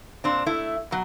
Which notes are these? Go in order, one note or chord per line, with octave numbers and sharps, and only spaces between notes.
A#2 C4 D4
A3 E4
B2 F#3